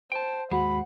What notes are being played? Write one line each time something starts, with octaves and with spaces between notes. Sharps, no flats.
C5 G5 A5
D#2 G#2 G#3 F#4 F#5 B5